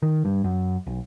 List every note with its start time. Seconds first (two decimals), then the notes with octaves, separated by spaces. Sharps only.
0.02 D#3
0.25 G2
0.44 F#2
0.87 B1